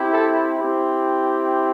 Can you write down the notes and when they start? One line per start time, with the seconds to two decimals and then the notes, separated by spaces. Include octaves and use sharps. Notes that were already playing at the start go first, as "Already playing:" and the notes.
Already playing: C4 E4 G4
0.12 A4
0.58 C4 E4 G4